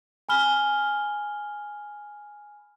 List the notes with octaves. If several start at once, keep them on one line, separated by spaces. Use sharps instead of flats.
G#5 B5 F6 G7